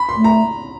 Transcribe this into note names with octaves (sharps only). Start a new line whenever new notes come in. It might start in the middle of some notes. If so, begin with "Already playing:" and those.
Already playing: B5
C6
A3
A#5